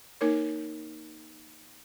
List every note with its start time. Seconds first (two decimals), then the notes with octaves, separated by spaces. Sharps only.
0.21 A#3 D#4 A#4 C#5